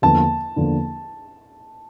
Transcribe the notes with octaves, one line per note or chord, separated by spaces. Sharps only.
E2 D3 F3 A#3 D4 A5
E2 D3 F3 A#3 D4